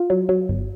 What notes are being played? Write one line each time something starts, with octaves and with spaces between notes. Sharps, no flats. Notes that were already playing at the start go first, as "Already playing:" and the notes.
Already playing: F4
F#3
F#3
G1